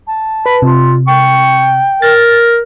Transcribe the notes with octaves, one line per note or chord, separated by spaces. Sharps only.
A5
B4 B5
C3 F4
G5 C#6
A#4 A6